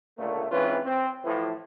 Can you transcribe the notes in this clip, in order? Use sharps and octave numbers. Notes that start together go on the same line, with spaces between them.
C#2 A#2 D3 A3
G#2 E3 C4 C#4 F4 B4
C4
A2 E3 F3